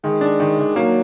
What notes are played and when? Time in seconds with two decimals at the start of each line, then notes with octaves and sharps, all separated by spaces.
0.04 D#3 G#3
0.21 D4
0.40 D#3
0.59 D#3
0.76 F#3 A#3